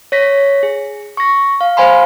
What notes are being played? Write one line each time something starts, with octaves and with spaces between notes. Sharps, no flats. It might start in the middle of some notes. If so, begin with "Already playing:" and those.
C#5 A#6 B6
G#4
C#6 A#6
F5
C5 F5 G#5 B5 C6